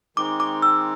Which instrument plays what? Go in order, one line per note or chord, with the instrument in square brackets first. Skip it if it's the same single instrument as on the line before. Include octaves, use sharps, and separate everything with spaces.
[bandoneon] D#3 G#3 C4 D#4 [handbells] D6
[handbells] D6
E6